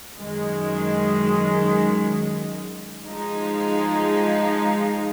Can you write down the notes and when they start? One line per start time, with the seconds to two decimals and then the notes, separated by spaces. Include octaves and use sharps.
0.17 F#2 D#3 G#3
3.05 F3 G#3 D#4